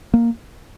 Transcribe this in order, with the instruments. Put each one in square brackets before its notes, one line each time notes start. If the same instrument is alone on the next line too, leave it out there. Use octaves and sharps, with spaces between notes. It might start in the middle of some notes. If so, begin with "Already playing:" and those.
[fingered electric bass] A#3